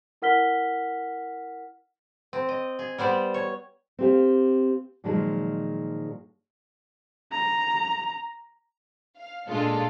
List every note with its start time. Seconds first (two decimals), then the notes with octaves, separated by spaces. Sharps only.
0.22 E4 A#4 F#5 F6 B6 G7
2.33 C4
2.49 D#5
2.79 G#4
2.98 G3 B3 C5 D5
3.34 C#5
3.99 C4 G4 F5
5.04 A#2 D#3 F3 F#3 G#3
7.32 A#5
9.18 F5
9.48 A#2 G#3 D4 F4 A4